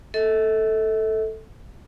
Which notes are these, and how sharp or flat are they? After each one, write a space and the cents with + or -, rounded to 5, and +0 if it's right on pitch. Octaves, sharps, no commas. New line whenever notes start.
A4 +0 E5 -45